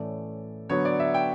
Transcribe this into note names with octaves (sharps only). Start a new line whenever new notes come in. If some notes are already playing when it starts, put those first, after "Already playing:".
Already playing: A2 E3 A3 C#4 D5
D3 F#3 B3 C#5
D5
E5
G5